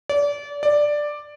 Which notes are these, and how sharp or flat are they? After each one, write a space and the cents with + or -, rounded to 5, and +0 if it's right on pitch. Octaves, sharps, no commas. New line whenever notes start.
D5 -30
D5 +5